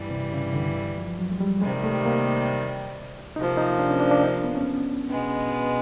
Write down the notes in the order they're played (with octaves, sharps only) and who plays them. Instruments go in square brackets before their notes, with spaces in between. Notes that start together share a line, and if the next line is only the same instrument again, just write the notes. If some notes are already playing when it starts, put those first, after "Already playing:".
Already playing: [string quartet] G2 E3 G3
[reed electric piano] C3
C#3
D3
F3
F#3
G#3
G3
[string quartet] C3 D#3 G3 [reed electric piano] G#3
[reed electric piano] A3
A#3
[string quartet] C3 F3 A#3 [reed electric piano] D#4
[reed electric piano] D#4
D4
C#4
D4
D4
D#4
D4
B3
C#4
B3
[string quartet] B2 G#3 B3